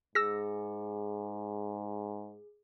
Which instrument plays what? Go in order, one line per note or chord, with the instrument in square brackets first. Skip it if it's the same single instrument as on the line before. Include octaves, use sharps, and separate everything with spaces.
[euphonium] G#2 [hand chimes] G#4 [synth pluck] E6 A#6